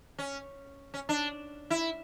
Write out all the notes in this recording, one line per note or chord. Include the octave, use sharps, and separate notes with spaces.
C#4
C#4
D4
E4